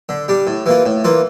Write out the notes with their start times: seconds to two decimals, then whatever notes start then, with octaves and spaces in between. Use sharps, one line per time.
0.09 D3
0.28 G3 D4
0.47 A2
0.66 E3 A#3 F4
0.85 A2
1.04 E3 A#3 F4